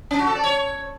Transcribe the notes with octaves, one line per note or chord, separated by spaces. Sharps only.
C#4
F#4
A4
D5
C#5